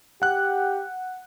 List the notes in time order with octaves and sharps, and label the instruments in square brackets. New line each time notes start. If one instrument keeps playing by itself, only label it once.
[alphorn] G4 [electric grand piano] F#5 F#6